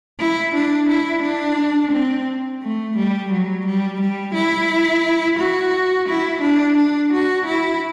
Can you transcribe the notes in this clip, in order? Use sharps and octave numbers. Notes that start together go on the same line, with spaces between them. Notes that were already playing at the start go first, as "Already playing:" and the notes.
E4
D4
E4
D4
C4
A3
G3
F#3
G3
G3
E4
F#4
E4
D4
D4
F#4
E4